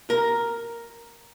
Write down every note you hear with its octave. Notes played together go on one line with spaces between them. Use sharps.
A#4